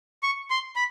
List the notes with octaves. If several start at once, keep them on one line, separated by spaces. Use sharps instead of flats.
C#6
C6
B5